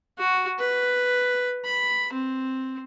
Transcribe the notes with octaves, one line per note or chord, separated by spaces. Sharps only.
F#4
B4
B5
C4